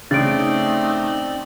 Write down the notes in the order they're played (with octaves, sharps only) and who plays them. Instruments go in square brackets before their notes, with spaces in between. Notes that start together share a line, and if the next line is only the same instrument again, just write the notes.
[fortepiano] C#3 [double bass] A3 D#4 [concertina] C4 D5 [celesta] A6 D7